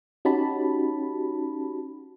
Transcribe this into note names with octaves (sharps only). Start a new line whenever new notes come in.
C#4 D#4 F#4 G4 A5 B5